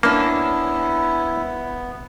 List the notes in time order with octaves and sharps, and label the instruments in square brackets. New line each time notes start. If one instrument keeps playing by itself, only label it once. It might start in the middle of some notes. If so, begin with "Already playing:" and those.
[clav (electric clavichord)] A#3 [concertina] B3 [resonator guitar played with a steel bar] C#4 D4 [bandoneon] E4